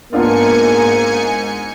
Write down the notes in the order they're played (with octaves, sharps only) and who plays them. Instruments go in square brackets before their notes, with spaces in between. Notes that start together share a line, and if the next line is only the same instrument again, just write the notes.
[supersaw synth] G#2 G#5 C#7 [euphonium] A#3 [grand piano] B3 D4 F4